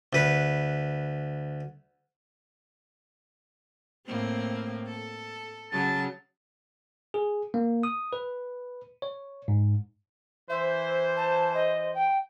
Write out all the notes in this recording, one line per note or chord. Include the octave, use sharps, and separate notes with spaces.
D2 B4
A2 A#3 C4
A4
C#3 F#3 A5
G#4
A#3
D#6
B4
C#5
G#2
E3 C5 E5
A5
D#5
G5